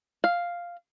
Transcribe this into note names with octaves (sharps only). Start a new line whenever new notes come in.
F5